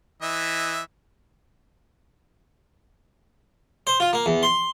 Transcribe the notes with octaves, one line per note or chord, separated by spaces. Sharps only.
E3 D#5 E5
C5
F4
A#3
E2
C6